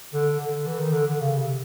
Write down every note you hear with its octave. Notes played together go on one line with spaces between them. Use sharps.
D3
D3
E3
D#3
D3
D3
C#3
C3